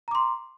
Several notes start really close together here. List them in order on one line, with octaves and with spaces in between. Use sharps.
A#5 D6 C6